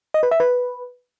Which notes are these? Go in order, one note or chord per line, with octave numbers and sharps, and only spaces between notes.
D#5
B4
E5
B4